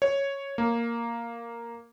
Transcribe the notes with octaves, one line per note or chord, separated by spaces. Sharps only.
C#5
A#3